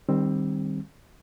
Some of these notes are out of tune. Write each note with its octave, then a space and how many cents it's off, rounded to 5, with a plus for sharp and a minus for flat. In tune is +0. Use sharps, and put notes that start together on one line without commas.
D#3 -20 G3 +10 C4 +15